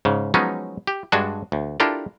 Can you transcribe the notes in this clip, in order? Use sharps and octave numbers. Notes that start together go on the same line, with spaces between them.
G#2 C#3
F3 F#3 G#3 B3 C#4 D#4
G4
G2 G#3 D4 F#4 G#5 A5
D2
D4 E4 F4 G4 A4 A#4